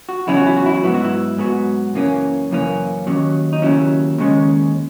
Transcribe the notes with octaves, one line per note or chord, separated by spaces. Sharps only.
F#4
E2 C#3 F#3 C#4 E4
F#4
E4
F#4
E4
F#4
G#2 F#3 B3 E4
F#4
E4
G#2 F#3 B3 F#4
F#2 C#3 E3 A#3 C#4
F#2 C#3 E3 A#3 C#4
D#2 C#3 F#3 C#4
D#4
D#2 C#3 F#3 C#4 E4
D#2 C#3 G#3 C#4